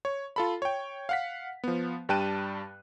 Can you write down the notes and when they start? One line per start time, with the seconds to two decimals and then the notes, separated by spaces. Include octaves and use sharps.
0.05 C#5
0.36 F4 A4 B5
0.62 C#5 G5
1.09 F5 F#5 B6
1.64 F3 B3
2.09 G2 G3 G5 A5 F#6 D#7